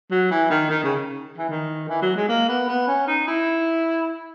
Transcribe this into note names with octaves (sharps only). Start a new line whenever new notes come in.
F#3
E3
D#3
D#3
C#3
E3
D#3
E3
F#3
G#3
A#3
B3
B3
C#4
D#4
E4